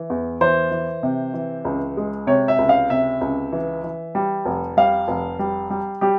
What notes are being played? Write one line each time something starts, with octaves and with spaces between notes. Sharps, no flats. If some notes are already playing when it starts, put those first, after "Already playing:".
Already playing: E3
E2
E3 C5
E3
C3
E3
C#2
G#3
C3 C#5
E5
C#2
F5
C3 E5
C#2
E3
E3
G3
F1
G3 F5
F1
G3
G3
G3 G4